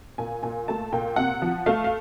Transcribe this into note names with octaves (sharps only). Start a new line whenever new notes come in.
A#2 G#5
A#2 G#5
A3 A5
A#2 G5
C3 F#5
F3
A3 F5
F5